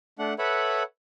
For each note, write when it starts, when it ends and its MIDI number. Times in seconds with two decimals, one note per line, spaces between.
0.19 0.34 57
0.19 0.34 62
0.19 0.34 78
0.39 0.83 69
0.39 0.83 71
0.39 0.83 73
0.39 0.83 76
0.39 0.83 78
0.39 0.83 83